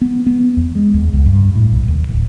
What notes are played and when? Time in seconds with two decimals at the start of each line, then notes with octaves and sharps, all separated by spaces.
0.01 B3
0.26 B3
0.57 E2
0.75 G#3
0.94 D#2
1.13 C#2
1.26 G2
1.55 A2
1.72 B1
1.88 D#2
2.09 D1